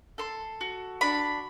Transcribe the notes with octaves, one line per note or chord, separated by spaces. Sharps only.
A4 C6
F#4
D4 B5